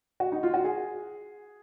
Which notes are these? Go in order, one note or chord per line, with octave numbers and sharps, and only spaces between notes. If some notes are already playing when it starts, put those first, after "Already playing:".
F#4
D#4
F4
F#4
G#4